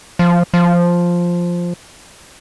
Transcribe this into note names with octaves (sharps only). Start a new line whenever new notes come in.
F3
F3